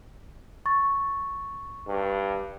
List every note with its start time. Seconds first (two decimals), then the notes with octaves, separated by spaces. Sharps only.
0.66 C#6 A6
1.87 G2